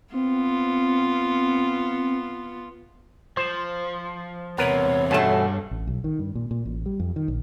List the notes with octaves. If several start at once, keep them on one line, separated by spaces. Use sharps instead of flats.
B3 C4 F4
F3 C5
E2 C3 B3 A#4 B4 C#5
A1 G2 B2 A3 G#5 A5
A1
B1
D#3
G2
A#2
A#2
A1
G3
F2
D#3
A#1